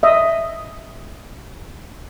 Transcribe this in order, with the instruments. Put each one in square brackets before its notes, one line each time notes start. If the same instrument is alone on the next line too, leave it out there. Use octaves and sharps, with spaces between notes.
[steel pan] D#5 E5